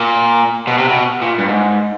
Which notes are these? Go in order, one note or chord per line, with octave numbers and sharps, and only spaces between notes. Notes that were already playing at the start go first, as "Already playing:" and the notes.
Already playing: A#2
B2
C3
B2
A#2
G2
G#2